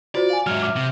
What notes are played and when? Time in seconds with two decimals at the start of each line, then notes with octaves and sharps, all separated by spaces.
0.15 F4 F#4 C5 D5
0.30 F5 G#5
0.47 G#2 F#3 E5 F6
0.61 E5 D6 F6
0.77 C3